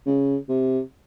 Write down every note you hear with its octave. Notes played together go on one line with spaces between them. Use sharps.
C#3
C3